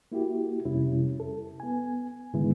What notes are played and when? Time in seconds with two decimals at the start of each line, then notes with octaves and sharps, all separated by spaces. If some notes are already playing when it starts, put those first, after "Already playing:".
0.12 A#3 E4 F#4 G4
0.65 F2 C3 G3 C#4 E4
1.20 A4
1.60 B3 G#5
2.33 G#2 D3 D#3 G#3 B3 E4